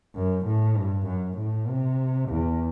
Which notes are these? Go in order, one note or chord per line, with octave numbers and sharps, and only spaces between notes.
F#2
A2
G2
F#2
A2
C3
E2